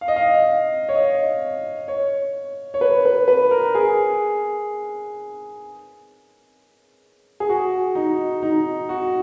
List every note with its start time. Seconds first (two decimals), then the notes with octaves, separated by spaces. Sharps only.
0.01 F5
0.08 D#5
0.16 F5
0.89 C#5
0.95 D#5
1.88 C#5
2.74 C#5
2.81 B4
3.05 B4
3.28 B4
3.51 A#4
3.75 G#4
7.40 G#4
7.49 F#4
7.95 D#4
8.43 D#4
8.89 F#4